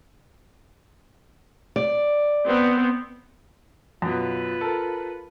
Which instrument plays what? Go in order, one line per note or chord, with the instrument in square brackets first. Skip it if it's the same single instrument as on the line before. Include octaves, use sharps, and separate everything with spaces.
[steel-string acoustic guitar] D5
[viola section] B3 C4
[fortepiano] F#2 B2 [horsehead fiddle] F4 B4
[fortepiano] A4 A#4